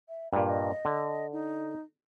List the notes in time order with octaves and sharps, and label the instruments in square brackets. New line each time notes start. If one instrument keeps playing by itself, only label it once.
[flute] E5
[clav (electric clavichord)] G2 A#2 [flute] B5
[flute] D#5
[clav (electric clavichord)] D3
[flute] D#4